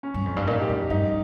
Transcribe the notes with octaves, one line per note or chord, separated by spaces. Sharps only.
C#4
G2
F2
G2
A#2 D#4
G4
F2
G2 D#4